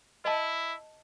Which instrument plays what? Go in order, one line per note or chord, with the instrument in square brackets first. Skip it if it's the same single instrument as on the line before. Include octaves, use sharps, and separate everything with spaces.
[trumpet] E4 [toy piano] D#5 A5